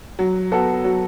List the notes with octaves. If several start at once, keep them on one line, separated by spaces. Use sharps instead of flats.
F#3
B3 F#4 A4
F#3